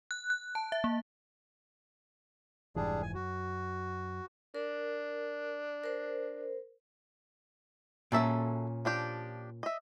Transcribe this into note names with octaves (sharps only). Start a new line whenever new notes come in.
F#6
F#6
A5
E5
A#3
F1 G#2 E3 G3 D4 G#4
G#5
F#2 F#4
D4 A#4
A#4 C5
A#2 F#3 C#4 A4 E5
F3 D4 G4
D#5 E5